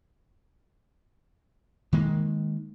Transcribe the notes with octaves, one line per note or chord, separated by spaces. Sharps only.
D#3 G#3 A#3